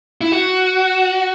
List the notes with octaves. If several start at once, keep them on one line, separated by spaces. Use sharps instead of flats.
E4
F#4